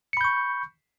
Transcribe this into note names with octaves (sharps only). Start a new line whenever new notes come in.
B5 C#6 G6 C#7